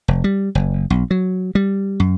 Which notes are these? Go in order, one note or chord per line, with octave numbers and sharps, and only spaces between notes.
F1
G3
F#1
B1
F#3
G3
F#2